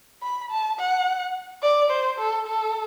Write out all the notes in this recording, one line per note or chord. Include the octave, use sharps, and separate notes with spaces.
B5
A5
F#5
D5
C5
A4
A4